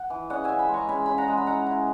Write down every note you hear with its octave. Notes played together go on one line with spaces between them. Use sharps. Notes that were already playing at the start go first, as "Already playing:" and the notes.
Already playing: F#5
E3
C#3 D#5 F#5
C#3 E5 G#5
G#5 B5
G#3
A#5 C#6
C#3 G#5 B5
C#3 B5
F#5 A#5
G#3
B5
E4 F#5 A#5
E4